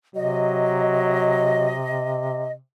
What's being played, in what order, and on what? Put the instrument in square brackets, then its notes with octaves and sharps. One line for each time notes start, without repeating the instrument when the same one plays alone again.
[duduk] C3 [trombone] F#3 [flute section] D#5